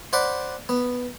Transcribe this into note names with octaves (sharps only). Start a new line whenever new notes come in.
C5 D5 F#5 B5
B3